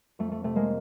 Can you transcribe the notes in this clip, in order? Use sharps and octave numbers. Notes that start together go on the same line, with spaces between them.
F2 A3
A3
C3 A3
G#3 A#3